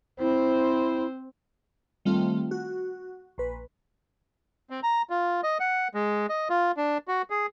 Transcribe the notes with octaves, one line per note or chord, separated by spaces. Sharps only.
C4 E4 C5
D#3 G3 A3 C4 F4
F#4
A#1 B4
C4
A#5
F4
D#5
F#5
G#3
D#5
F4
D4
F#4
G#4